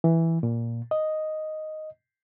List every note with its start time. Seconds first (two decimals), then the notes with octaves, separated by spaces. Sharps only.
0.04 E3
0.43 A#2
0.91 D#5